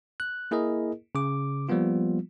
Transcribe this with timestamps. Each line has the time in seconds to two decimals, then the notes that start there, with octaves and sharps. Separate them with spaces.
0.20 F#6
0.51 A#3 E4 G#4 A#4 D#5
1.15 C#3 D6
1.69 F3 G3 A#3 B3 F4